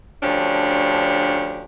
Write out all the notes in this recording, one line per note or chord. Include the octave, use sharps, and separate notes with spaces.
D2 F3 C#4 D4 G4